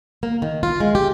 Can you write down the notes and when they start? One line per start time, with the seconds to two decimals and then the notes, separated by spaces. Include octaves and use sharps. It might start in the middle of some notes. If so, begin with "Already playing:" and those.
0.23 A#3
0.42 D#3
0.63 F4
0.80 G#3
0.95 G4